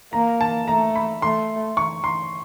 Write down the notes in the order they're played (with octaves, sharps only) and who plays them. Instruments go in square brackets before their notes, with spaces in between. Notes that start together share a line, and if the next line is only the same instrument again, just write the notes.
[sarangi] A#3 [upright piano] A#5
[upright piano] A5
[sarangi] A3 [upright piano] A#5
[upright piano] B5
[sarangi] A3 [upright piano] C6
[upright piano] C#6
C6